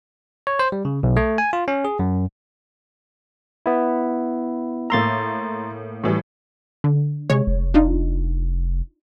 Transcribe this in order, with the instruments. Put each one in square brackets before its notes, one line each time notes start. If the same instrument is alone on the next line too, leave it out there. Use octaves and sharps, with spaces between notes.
[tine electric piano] C#5
C5
G3
C#3
B1
A3
G#5
F4
C#4
G#4
F#2
B3 E4
[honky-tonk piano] A2 A#3 E6 [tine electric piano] A#5 C6 A6
[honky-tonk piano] A2 E3 G3
[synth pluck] D3
[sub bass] C3 [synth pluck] G#3 C#5
[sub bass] F1
[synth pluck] D4 D#4 F4